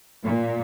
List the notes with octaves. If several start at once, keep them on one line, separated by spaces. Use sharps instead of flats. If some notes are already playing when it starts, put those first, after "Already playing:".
A#2